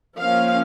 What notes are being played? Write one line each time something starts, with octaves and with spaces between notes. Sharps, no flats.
F3 A#3 C#4 F5